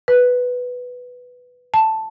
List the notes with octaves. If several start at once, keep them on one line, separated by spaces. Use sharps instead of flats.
B4
A5